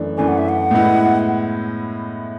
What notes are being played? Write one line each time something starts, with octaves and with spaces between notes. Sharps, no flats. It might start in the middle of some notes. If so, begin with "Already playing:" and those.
Already playing: F#2 E3 A3 D4
F#2 E3 A3 D4 G#5
F#5
E5
F#5
A2 G#3 B3 E4